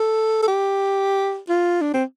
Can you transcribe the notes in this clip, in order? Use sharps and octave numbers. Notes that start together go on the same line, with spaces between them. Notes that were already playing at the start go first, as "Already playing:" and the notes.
Already playing: A4
A4
G4
F4
D4
C4